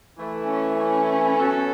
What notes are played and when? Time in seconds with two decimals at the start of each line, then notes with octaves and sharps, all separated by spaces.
0.17 E3 A3 E4
0.47 C#4
0.77 C#4
1.37 F#3 B3 F#4 A4